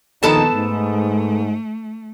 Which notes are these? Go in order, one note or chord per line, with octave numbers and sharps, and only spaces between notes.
A#1 D#2 D#3 B3 D#4 A4 A5
G#2 A3